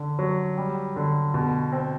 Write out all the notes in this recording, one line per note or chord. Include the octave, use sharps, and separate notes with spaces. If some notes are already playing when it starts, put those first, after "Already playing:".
Already playing: D3
F#3
G3
D3
B2
C4